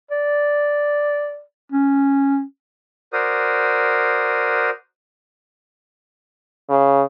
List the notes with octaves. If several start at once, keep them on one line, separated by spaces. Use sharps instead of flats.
D5
C#4
F#4 A#4 C5 D5 D#6
C#3